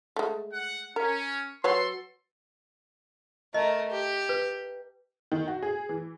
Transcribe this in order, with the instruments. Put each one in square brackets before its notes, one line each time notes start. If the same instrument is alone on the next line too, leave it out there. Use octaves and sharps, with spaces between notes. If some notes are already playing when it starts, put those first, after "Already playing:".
[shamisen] G#3 A3
[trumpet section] F#5
[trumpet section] C#4 [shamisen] A#4
[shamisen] F#3 B4 C#5 [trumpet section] A4 C6
[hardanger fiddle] A3 A#4 [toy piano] D#5
[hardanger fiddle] G4
[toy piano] B4
[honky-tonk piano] D#3
F#4
G#4
E3